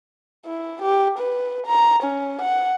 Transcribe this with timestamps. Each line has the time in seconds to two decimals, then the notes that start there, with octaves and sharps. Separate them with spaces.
0.46 E4
0.82 G4
1.19 B4
1.67 A#5
2.03 C#4
2.42 F#5